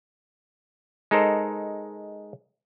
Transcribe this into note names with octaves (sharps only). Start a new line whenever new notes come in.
G#3 D#4 A4 A#4 C5